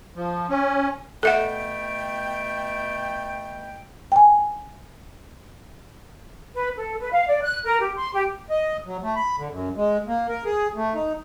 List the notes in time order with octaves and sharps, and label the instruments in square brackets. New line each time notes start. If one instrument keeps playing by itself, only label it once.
[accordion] F3
C#4
[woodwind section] B2 A3 G5 [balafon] A4 E5 F#5
[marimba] G5 G#5
[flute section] B4
A4
B4
F5
D5
F#6
A#4
G4
C6
G4
[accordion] D#5
F#3
A3
B5
D3
F#2
G#3
A#3
A#4
G#4
A3
D#4